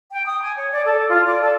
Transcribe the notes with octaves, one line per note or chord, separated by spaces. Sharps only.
G5
D#6
G#5
C#5
D5
A4
F4
D5
A4